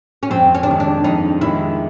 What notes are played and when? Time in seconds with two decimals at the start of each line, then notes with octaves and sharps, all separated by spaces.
0.23 C#4
0.30 F2 C4
0.55 C#4
0.63 D4
0.67 C3 D#3 G#3 C#4
0.80 D4
1.04 F2 D#4
1.41 C3 D#3 G#3 E4